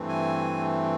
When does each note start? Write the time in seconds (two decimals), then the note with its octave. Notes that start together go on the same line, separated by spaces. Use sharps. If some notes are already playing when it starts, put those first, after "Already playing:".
Already playing: G2 E3 A3 C4
0.09 G#5